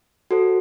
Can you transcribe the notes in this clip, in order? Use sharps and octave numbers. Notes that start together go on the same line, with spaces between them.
F#4 A4 C5